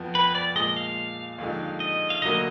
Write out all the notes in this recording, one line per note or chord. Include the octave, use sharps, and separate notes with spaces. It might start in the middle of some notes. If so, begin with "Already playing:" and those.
Already playing: F2 F3 B3
B4
D5
A#2 F3 G#3 D#5
F5
D#2 D3 F3 G#3 D#4
D#5
F5
D2 D3 F#3 A#3 D#5